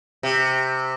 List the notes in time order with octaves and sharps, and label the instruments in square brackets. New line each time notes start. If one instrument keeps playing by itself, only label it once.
[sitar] C3